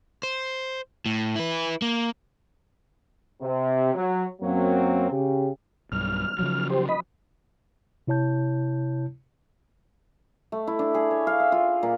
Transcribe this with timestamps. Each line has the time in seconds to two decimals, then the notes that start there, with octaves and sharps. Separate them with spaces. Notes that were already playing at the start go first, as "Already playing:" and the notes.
0.23 C5
1.06 A2
1.36 E4 B4
1.82 A#3
3.42 C3
3.95 F#3
4.42 F#2 F#3 A#3 C4
5.11 C#3 G4
5.92 B1 G2 F6
6.39 C#3 F3 F#3
6.70 G4 C5
6.89 D#5 B5
8.07 C3 E4 C#5 A5 G6
10.52 A3
10.67 E4
10.79 D4
10.94 G#4
11.11 C#5
11.27 F5
11.40 E5
11.52 F4
11.83 A#2